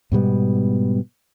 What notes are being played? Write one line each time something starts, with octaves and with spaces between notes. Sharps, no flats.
G#2 B2 G3 B3